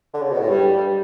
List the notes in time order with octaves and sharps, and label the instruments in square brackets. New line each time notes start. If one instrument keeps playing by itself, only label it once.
[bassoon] D3
C#3
B2
A2
[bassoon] G2 [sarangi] G3